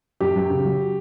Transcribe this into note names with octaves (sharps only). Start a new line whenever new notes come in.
F#2 G4
F#2
C#3
F#3